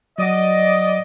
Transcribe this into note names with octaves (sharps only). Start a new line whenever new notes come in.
F#3 D5 D#5 F#5